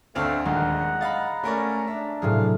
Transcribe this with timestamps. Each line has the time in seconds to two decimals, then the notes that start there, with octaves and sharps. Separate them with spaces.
0.15 D2 A3 C4 D5 F5 F7
0.45 D#1 D#2 D3 G#3 F#5 A#5
1.01 D#5 F5 B5 A6
1.44 A3 C#4 A#4 D5
1.87 D4 E5
2.22 A2 C3 F#3 G#4 F5